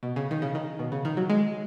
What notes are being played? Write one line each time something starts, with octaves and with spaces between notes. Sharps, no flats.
B2
C#3
D#3
C#3
D#3
B2
C#3
D#3
F#3
G#3